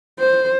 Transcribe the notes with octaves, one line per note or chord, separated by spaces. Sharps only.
C5